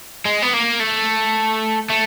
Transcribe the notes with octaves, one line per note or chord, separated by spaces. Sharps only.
G#3
B3
A#3
A3
A3